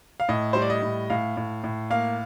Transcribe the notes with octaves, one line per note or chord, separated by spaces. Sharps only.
F5
A2 D#5
G3 C5
D5
D#5
A2
A2 F5
A2
A2
A#3 F5